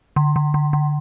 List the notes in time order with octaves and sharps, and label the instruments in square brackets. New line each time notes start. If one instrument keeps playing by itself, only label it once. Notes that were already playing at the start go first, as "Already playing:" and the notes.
[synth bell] D3
D3
D3
D3